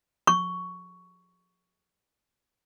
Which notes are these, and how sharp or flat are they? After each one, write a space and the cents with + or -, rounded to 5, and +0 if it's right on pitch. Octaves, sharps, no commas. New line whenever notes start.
C#6 +10